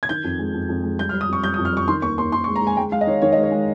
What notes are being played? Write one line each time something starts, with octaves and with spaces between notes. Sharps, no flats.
G#6
D#3 G6
F2
G#3
F2
F2
G#3
G3 G6
F6
G3
D#6
F2 C#6
G3 G6
D#6
F2
F6
G3 C#6
D#3 C6
D#2 C#6
D#2 C6
D#2 C6
C#6
G#3
A#5
G#3 G#5
G#3 G5
G#3 F5
D#5
D#3 C#5
D#3 C#5
G#3 D#5
C#5
G#3